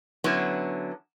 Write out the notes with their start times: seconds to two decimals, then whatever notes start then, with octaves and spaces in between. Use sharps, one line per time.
0.24 D3 F#3 B3 C#4 E4